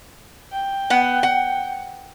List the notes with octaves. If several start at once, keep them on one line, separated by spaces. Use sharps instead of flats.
G5
B3 F#5
F#5